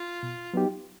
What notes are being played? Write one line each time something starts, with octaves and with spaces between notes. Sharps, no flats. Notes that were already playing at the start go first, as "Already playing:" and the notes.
Already playing: F4
B2
F#3 B3 D#4 G4